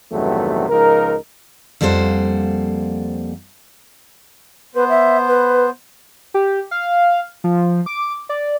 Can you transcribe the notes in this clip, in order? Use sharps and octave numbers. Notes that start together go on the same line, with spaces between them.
E2 G2 C3 D#3 F#3 A3
C#2 F3 D#4 A#4
F2 G3 A#3 A4 C5 F#5
B3 B4 C5
E5
B4
G4
F5
F3
D6
D5